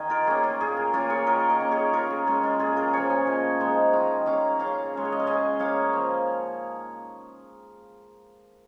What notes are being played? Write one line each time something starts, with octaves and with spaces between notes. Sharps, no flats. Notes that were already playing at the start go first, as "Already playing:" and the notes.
Already playing: D#3 D#4 D#5 F5 G#5
F4 A#4
A#3 C#4 G#4
F4
A#2 G#4
F4
A#3 C#4 F4 A#4
G#4 C#5
D#3 A#4 D#5
A#4 D#5
A#3 C#4
G#4 C#5
C#3 F4 A#4
G#4
G#3 C#4 G#4
F4
A#2 G#4
F4 A#4
F3 C#4 G#4 C#5
D#5 G#5
A#2
F3 G#3 D#4
D#3 F5 A#5
A#3 C#4 F5 A#5
C#3 F5 A#5
G#3 C#4
C#5
D#5
F5
C#3 D#5 G#5
A#3 C#4 C#5 F5
F3